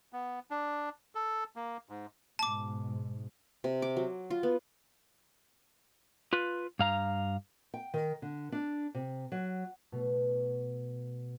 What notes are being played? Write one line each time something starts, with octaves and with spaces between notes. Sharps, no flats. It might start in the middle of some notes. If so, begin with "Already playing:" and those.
B3
D4
A4
A#3
G#2
G#2 B2 A5 D6
C3
D6
F#3
F4
B3
F4 B4
G2 F5 A#5
G5
D#3
D3
D4
C3
F#3
B2 A3